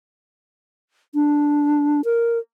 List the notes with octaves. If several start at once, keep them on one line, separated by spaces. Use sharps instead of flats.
D4
A#4